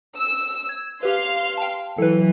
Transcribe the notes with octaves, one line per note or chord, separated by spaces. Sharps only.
E6
G#6
G4 B4 F5 C6
G5 A5
E3 F#3 A4 B4